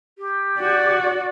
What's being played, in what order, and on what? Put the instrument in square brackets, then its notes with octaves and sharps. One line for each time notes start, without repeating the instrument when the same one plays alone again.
[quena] G4
[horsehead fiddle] F#4 D5